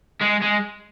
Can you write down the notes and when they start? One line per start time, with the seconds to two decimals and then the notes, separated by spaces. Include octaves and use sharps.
0.21 G#3
0.42 G#3